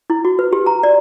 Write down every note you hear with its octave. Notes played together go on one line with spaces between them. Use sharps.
E4
F#4
B4
G4
A#5
D5